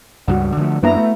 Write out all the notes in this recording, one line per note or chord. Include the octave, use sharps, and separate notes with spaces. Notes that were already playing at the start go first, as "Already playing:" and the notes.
C#2 G2 G3 F#4 F#5
D3 F3 A3
F#2 A#3 B3 D4 E4 A#5
A3